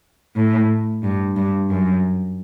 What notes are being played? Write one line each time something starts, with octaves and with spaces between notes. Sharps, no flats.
A2
G2
G2
F#2